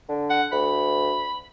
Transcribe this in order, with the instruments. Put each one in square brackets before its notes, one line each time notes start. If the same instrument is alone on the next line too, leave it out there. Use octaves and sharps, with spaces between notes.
[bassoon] D3
[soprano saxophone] F#5
[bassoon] D2 [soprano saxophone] B5